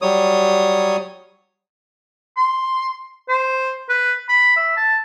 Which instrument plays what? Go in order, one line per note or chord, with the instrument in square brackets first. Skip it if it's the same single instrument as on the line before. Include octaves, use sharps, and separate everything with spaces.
[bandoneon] F#3 G3 C#5 D#6
[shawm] C6
C5
B4
B5
E5
A5